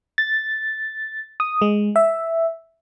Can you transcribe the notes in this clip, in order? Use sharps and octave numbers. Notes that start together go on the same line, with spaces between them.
A6
D#6
G#3
E5